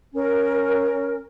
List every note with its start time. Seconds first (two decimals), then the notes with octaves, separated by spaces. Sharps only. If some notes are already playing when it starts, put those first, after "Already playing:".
0.13 C#4 A#4